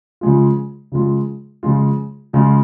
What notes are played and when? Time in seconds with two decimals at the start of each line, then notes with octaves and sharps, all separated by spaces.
0.21 C#3 F3 G#3 F4
0.92 C#3 F3 G#3 F4
1.63 C#3 F3 G#3 F4
2.33 C#3 F3 G#3 F4